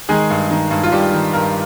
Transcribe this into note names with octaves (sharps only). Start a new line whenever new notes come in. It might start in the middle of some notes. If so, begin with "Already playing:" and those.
D#3 G#3 G#4
G2
D#3
G2
F4
G2 G3 G4
D#3
G2 A#4